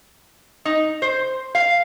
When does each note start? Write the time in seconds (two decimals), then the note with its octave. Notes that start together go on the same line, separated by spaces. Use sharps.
0.65 D#4
1.02 C5
1.55 F5